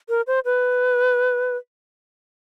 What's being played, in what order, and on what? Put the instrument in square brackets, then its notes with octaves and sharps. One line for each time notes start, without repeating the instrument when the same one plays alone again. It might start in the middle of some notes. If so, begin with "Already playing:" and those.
[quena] A#4
C5
B4